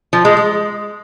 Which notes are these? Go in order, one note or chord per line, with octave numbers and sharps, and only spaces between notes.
F3
G#3
G#3